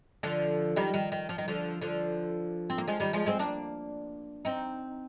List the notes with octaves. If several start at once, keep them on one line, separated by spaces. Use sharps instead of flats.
D3 F3
D#3 G3
D#3
D#3
F3
D#3
D3 F3
D3 F3
C4
A#3
F3 G#3
D#3 G3
F3 G#3
G#3 C4
A#3 D4
C4 D#4